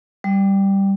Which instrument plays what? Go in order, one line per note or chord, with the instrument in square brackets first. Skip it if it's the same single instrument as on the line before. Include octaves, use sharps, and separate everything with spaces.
[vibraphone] G3